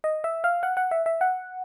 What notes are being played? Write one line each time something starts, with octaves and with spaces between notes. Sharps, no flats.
D#5
E5
F5
F#5
F#5
E5
E5
F#5